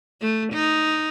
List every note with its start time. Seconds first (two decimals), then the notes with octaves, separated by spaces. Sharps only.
0.21 A3
0.53 D#4